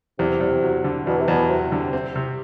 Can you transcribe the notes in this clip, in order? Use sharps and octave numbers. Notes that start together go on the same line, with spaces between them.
E2 C3
E2
F#3
D3
E2 B2
C3
E2 B2
C3 F#3
D3
C4
C3